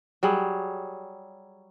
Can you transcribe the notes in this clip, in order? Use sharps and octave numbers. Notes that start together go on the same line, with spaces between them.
F#3 G3 G#4